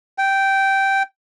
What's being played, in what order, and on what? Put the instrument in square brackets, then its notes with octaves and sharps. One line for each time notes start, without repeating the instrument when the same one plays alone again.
[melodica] G5